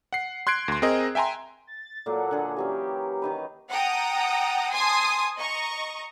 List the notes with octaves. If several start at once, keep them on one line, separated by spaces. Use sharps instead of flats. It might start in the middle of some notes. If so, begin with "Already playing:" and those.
F#5 C7
C6 F#6 G#6 C7 D7
D2 C6
C4 G#4 A#4 D#5
E5 G5 G#5 A#5 C6
A6
A#2 F#3 A#3 A4 F#5
D3 G#4
E3 F#3 C#4 G4
D#3 D#4 B4
F#5 G5 A5 A#5 D#6
G#5 A5 C6 D#6 G#6
D#5 A#5 C#6